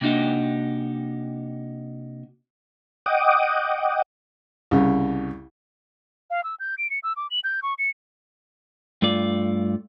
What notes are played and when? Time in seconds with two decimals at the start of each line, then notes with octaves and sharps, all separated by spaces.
0.01 C3 A#3 D4 D#4 F#4 G4
3.06 D#5 F#5 G5 D6 D#6
4.71 C2 C#3
6.30 F5
6.44 E6
6.59 G6
6.78 D7
6.90 C#7
7.03 E6
7.16 D6
7.30 F#7
7.44 G6
7.62 C#6
7.78 C#7
9.02 G2 A3 F4 D5